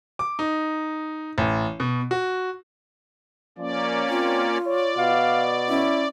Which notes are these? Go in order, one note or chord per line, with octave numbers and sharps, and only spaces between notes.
D6
D#4
A1
B2
F#4
F3 A#3 C#4 D5
C4 F4
C#5 D5
B2 F5
C#4 E4